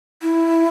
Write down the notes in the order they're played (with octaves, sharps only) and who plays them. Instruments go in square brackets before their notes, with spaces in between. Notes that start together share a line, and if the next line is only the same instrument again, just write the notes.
[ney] E4